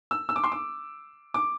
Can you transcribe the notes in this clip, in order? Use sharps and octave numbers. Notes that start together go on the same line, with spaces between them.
E6
E6
D6
C6
D6
D6